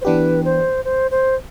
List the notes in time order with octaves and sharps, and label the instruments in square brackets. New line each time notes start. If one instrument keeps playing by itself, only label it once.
[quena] C5
[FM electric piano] E3 B3 D4 G4 [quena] B4
[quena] C5
C5
C5